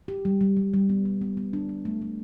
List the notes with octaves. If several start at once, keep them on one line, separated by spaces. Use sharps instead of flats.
G4
G3
G3
G3
G3
B3
G3
B3
B3
D4
B3
A3
A3